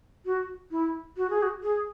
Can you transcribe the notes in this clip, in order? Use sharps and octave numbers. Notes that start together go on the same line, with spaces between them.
F#4
E4
F#4
G#4
F#4
G#4